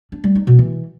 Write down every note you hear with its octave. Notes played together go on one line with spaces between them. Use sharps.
D4
G3
D#4
B2
E3